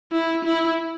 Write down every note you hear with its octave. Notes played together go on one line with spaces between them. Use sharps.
E4
E4